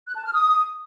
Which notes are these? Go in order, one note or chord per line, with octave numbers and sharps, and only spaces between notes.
F#6
A5
F6
D#6